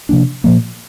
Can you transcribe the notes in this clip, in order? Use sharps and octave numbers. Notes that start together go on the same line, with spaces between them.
C3 F3 A#3 D4
A#2 F3 A#3